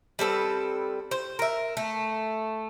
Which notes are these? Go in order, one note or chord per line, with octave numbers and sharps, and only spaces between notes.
G3 C4 A4 B4
C5
A#4 E5
A3